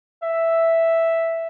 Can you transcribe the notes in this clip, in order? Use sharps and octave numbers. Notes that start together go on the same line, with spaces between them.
E5